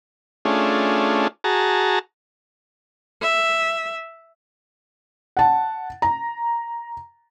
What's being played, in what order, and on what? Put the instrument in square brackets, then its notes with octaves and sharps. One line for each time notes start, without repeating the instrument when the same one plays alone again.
[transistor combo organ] A3 C#4 D4 F4 G#4
F#4 G#4 A5 A#5
[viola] E5
[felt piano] F#5 A5
A#5